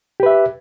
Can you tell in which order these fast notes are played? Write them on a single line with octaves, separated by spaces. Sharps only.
G4 B4 E5